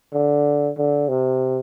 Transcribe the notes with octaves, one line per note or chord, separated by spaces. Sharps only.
D3
D3
C3